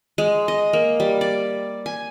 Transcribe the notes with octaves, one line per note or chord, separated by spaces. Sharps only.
G#3
D#5
A#3
G3
D5
G#5